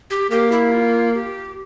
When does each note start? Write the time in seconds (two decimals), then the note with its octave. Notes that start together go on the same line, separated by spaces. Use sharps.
0.10 G4
0.31 A#3 G4
0.52 E4
0.72 F4
1.14 G4